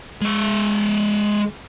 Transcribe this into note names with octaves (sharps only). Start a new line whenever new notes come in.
G#3 E5